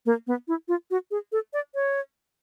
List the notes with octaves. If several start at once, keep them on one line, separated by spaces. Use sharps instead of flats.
A#3
B3
E4
F4
F#4
G#4
A4
D5
C#5